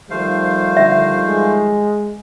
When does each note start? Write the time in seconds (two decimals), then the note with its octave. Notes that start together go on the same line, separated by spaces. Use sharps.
0.10 D#3 F3 G3 A3 C5 F5
0.77 D3 E5
1.26 G#3